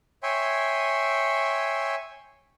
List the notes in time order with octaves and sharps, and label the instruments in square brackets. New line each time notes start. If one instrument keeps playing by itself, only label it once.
[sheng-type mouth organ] C#5 E5 G5 G#5 C6